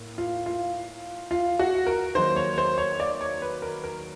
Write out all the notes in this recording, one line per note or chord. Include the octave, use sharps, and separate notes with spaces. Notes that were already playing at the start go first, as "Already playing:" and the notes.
Already playing: A2 A#3
F4
F4
F4
F#4
A#4
D#3 F#3 A#3 C5
C#5
C5
C#5
D5
C#5
B4
A#4
A#4